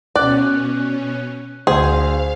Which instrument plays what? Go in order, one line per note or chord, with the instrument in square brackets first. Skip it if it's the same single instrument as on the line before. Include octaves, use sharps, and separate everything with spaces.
[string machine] B2 C#4 [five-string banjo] D5 [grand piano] F#6
[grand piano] D2 D4 [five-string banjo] G#4 [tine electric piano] C5 [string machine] F5